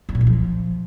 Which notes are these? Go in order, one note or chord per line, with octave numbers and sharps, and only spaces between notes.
E2
A#2
D#3
F3